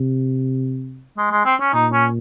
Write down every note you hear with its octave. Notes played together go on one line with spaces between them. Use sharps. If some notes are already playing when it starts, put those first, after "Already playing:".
Already playing: C3
G#3
G#3
C4
C#4
A#2 D#4
C#4